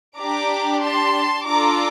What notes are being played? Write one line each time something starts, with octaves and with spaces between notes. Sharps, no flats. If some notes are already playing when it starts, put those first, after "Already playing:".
D4 G4 A#5 D6
A5 C6
D4 F4 A4 A#5 D6